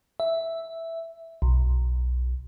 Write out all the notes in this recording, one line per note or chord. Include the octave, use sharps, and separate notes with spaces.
E5
B1